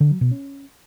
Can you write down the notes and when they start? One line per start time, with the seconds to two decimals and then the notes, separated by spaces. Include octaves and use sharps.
0.01 D3
0.11 F#3
0.21 B2
0.31 C#4